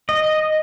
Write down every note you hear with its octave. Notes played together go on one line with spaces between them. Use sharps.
D#5